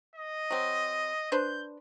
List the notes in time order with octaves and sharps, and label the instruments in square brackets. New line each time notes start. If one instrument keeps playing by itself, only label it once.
[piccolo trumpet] D#5
[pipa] F#3 C4
[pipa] D4 B4 C5 [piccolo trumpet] G6